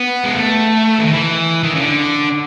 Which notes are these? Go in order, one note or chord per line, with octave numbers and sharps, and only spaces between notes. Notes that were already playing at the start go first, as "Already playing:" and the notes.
Already playing: B3
G#3
A3
E3
D#3
E3
D#3
C#3
D3